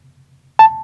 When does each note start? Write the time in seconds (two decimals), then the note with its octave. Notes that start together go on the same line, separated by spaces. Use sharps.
0.59 A5